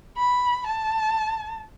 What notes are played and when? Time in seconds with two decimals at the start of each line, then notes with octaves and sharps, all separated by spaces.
0.17 B5
0.66 A5